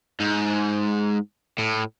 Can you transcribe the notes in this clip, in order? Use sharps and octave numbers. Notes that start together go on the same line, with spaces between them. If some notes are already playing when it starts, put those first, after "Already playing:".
G#2
A2